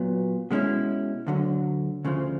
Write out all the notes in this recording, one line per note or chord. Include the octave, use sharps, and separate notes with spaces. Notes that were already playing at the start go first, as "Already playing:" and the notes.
Already playing: A#2 F#3 B3
B2 G#3 C#4 E4
D2 D3 F#3
D2 C#3 F3